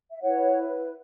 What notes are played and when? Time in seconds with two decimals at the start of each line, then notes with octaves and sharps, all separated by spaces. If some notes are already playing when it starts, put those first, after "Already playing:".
0.11 E5
0.22 E4 B4 C#5 F#5